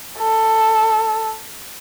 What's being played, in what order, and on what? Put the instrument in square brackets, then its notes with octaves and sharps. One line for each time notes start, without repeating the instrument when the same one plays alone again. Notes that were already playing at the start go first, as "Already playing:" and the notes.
[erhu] A4